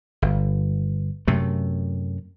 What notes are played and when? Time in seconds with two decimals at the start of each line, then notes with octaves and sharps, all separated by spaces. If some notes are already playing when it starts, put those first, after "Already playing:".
0.22 G1
1.28 F#2 C3 A3